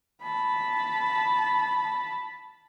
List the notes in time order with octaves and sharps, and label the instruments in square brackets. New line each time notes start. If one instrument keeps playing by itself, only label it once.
[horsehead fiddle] A5 B5